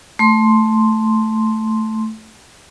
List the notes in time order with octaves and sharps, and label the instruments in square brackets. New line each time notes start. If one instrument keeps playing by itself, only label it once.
[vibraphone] A3 C6